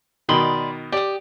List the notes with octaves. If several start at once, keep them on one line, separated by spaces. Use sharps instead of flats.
B2 D#3 D5 B5 C6
G4 D5 D#6